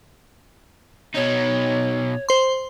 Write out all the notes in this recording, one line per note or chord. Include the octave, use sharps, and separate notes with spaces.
B2 D#4 C#5
C5 C6